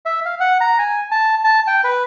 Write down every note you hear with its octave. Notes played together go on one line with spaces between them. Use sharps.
E5
F5
F#5
A#5
G#5
A5
A5
G5
B4